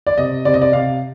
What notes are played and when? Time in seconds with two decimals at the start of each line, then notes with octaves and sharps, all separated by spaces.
0.07 D5
0.18 C3 D#5
0.45 C3 D5
0.54 D#5
0.62 D5
0.73 C3 F5